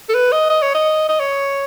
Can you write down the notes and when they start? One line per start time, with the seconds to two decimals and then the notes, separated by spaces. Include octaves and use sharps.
0.09 A4
0.14 B4
0.32 D#5
0.49 D#5
0.62 C#5
0.75 D#5
1.08 D#5
1.20 C#5